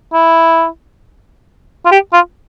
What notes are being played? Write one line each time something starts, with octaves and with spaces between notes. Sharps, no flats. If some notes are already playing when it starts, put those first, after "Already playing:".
E4
F4
G4
F4